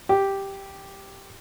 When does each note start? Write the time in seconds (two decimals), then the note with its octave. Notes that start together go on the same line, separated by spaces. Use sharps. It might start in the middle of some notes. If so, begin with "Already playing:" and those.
0.09 G4